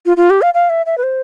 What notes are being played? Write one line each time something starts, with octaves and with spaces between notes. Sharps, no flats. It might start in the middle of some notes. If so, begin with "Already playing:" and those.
F4
F4
G4
F5
F5
E5
E5
B4
C5